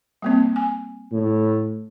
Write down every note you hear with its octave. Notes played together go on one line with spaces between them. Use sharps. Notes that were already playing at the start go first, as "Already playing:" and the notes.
G3 A#3 C4
G#5
A2